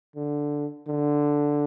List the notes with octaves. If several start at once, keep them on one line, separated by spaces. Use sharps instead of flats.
D3
D3